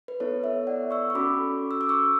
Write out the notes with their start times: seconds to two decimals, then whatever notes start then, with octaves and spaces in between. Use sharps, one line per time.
0.08 B4
0.20 B3 E4 A4 C#5
0.44 C#5 E5
0.67 D5 F#5
0.91 C#6 E6
1.10 C#6
1.14 C#4 F#4 A4 B5 D6
1.71 E6
1.81 D6
1.89 C#6 E6